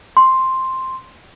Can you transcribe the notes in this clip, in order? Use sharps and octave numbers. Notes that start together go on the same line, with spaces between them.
C6